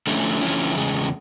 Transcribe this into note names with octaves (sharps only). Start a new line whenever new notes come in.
D3 F3 A3 C#4 E4
D3 F3 A3 C#4 E4
E2 C#3 G#3